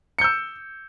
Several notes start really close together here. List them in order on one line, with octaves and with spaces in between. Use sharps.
C#7 G6 E6